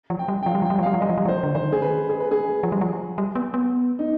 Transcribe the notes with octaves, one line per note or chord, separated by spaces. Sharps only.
F3
G5
G3
G5
F3 F5
G3
F3
G5
G3
F3
F5
G3
F3
G3 D#5
F3
G3
F3 C5
D3
D#3 C5
G#4
B4
G#4
B4
G#4
F3
G3
F3
G3
B3
B3
D#4